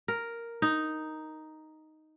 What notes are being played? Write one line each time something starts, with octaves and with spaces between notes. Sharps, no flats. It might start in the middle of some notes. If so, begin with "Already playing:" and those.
A#4
D#4